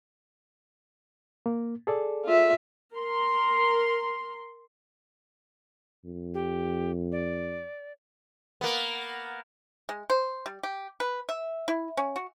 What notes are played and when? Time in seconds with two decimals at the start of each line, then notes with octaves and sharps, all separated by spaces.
1.46 A#3
1.87 G#4 A4 D5
2.25 F4 E5
2.94 A#4 C6
6.05 F2
6.34 G4
7.12 D5
8.61 A#3 B3
9.89 G#3
10.10 C5
10.46 G3
10.63 G4
11.00 B4
11.29 E5
11.68 E4
11.97 C#4
12.16 F#4